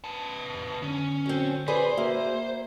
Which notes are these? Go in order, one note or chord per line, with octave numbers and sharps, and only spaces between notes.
B3 A5
F2
D3 C#4
F#3 C4
G#4 B4 C5 D5
A#3 F#4 E5